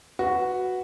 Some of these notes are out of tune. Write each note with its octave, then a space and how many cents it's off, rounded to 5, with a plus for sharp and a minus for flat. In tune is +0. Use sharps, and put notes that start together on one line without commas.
F#4 +0 B4 +0